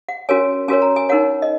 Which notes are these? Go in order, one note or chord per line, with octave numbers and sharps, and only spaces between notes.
F#5
C#4 F#4 A#4 C#5 G#5
C#4 F#4 A#4 C#5 G#5
A#5
G#5
D#4 A#4 C#5 F#5
D#5